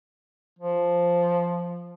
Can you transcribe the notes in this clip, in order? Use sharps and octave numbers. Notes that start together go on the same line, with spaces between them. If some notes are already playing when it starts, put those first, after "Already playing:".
F3